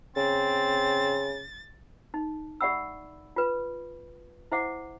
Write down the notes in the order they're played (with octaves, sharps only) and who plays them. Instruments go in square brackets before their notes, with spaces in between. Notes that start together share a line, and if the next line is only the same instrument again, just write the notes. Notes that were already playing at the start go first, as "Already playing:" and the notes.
[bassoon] C#3 [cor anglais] C4 [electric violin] A6
[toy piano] D#4
G4 D5 E5 F#5 B5 E6
F4 B4
E4 C5 E5 F#5 D6